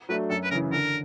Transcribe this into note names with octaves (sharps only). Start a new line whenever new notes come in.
F#3 A3 D4 B4
F#2 A4
B4
C#3 E3 A#4
D3 A#4